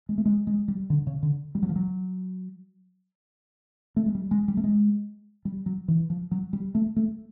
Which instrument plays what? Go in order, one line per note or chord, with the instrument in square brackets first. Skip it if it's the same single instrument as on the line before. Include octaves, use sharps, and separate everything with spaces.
[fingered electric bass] G#3
A3
G#3
G#3
G3
D3
C#3
D3
G3
F#3
F3
F#3
A3
G#3
G3
G#3
G3
A3
G#3
G3
F#3
E3
F3
F#3
G3
A3
A3